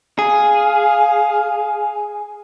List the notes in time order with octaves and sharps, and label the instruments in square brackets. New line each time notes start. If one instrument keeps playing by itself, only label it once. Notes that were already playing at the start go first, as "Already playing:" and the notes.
[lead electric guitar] G#4 [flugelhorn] F5